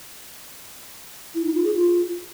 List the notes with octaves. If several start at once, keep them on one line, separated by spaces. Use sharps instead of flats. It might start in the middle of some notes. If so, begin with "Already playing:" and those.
E4
D#4
F4
G#4
F4